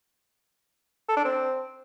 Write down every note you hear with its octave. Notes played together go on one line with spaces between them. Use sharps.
A4
D4
C4